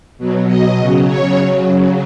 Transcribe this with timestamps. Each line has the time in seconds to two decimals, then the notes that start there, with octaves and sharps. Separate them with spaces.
0.18 B2 F#3
0.48 D#5
0.78 C#3 F#3
1.07 C#5
1.37 C#3 F#3